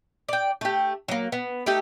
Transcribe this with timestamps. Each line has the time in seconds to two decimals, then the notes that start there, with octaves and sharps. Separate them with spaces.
0.29 D5 G5
0.61 A3 G4
1.08 F#3 A#3
1.32 B3
1.66 A3 D#4 G4 A4